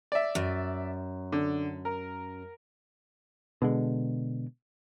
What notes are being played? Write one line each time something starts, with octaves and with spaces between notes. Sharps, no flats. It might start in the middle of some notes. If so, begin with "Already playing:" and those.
D5 E5
F#2
D3
A#4
B2 D3 G#3